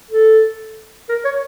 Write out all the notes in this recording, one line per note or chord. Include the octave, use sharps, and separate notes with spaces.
A4
A#4
C#5